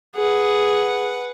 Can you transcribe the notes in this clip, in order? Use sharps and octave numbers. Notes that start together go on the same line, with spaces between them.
G#4 B4 F#5